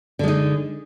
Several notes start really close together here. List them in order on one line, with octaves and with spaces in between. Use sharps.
D3 G#3 D#4